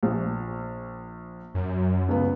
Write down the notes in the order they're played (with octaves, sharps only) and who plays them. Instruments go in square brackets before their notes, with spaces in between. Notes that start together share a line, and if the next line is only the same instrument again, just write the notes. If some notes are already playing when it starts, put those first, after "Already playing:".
[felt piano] A#1
[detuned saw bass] F#2
[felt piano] C#2 B3